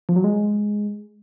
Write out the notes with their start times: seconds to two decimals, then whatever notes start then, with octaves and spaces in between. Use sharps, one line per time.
0.09 F3
0.16 F#3
0.24 G#3